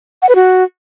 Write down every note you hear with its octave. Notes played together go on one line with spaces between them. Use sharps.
F#5
B4
F#4